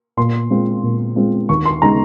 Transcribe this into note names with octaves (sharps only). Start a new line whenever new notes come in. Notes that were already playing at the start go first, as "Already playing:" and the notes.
A#2 C6
G#3 C4 F4
A#2
G#3 C4 F4
D#2 C#6
C6
C#3 G#3 D#4 A#5